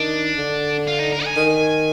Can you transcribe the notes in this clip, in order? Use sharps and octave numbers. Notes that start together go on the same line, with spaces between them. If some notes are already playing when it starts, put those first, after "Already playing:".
Already playing: D#3 D4
D3
F4
D#4
A#4
G#5
D#3